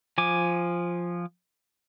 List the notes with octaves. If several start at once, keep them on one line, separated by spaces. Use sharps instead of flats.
F3 G#5 D6